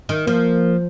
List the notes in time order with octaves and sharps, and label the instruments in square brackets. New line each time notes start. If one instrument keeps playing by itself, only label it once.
[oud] D#3
[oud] F3 [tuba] A#3